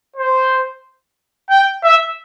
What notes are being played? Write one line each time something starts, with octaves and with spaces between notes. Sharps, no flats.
C5
G5
E5